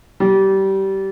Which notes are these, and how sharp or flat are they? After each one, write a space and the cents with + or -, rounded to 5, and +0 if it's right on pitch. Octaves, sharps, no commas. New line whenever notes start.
G3 -20